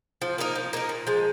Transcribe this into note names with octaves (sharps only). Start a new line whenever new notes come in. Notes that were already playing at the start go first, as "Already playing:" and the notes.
F3
A#3 D#4 A#4
F3
A#3 D#4 A#4
A#2
F3 G#3